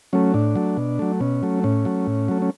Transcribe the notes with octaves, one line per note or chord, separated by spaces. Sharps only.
F#3 A3 C#4
A2 D4
F#3 A3
B2
F#3 A3
B2 C#4
F#3 A3
A2 C#4
F#3 A3
A2
F#3 A3
C#4